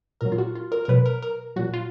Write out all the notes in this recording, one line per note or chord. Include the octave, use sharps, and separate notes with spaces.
A#2 F#3 A#4
F4
F#4
F4
A#4
A#4
B2 F#3 B4
A#4
A#4
A#2 F#3 F#4
F4